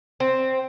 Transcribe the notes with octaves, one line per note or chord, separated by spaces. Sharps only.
C4